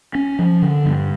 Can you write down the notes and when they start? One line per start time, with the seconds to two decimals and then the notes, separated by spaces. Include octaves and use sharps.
0.15 C#4
0.39 F3
0.62 D3
0.86 G2